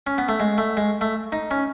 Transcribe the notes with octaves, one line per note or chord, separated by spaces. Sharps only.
C#4
B3
A3
G#3
A3
G#3
A3
D#4
C#4